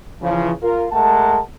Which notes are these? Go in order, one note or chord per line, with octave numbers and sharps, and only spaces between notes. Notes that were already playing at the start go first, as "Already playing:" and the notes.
C#3 E3 F3
F4 A#4
G#3 A3 A#4 F#5 A5